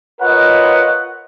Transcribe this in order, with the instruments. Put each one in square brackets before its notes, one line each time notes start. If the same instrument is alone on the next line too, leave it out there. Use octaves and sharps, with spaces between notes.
[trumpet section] F4 A#4 B4 C#5 D#5 F#5